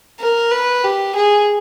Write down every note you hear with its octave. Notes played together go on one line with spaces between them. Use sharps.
A#4
B4
G4
G#4